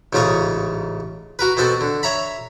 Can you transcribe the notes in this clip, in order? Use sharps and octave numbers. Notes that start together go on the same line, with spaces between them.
A1 G#2 C#3 F4 D#5 C#6
F#4 A#4 B4
B2 B3 C4 F#4 A4
D3
C#5 E5 A#5 B5